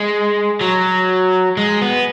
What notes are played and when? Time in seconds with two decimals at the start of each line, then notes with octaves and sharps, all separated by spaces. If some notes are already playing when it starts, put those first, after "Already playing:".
Already playing: G#3
0.61 F#3
1.57 G#3
1.82 B3